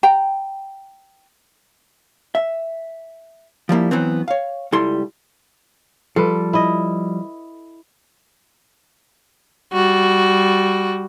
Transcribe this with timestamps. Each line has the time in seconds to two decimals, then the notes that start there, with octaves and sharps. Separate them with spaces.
0.03 G5 A#5
2.35 E5
3.69 F3 G3 A#3 E4
3.91 E3 F#3 B3 C4
4.28 C#5 F5
4.72 C#2 G3 E4 A4 C6
6.16 F3 G3 A4 B4
6.53 E4 D#5
9.73 G3 F#4